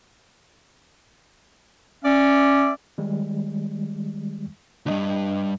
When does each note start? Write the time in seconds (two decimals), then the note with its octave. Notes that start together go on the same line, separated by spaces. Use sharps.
2.04 C#4 D5 E5
2.98 D#3 G3 G#3
4.86 D2 G2 D4 D#5